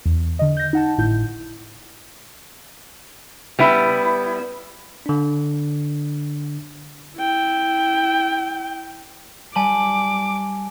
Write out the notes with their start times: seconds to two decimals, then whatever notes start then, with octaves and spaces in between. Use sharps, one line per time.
0.05 E2
0.39 D3 D#5
0.57 G6 A#6
0.73 D#4 F#5 A5
0.98 G#1 A2 E4 G6
3.59 G3 B3 E4
5.06 D3 D4
7.17 E4 G5
9.55 G3 G#5 A5 D6 F#7